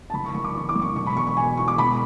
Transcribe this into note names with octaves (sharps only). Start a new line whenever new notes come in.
A5
F#1 B5
C#6
F#1 C#6
D6
E3 C#6
D6
F#2
C#6
E1 C#6
B5
E1 C#6
C#6
B2 G#5
E2 C#6
D6
E1 B5